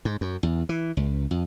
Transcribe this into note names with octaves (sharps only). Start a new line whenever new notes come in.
G#2
F#2
E2
E3
C#2
F2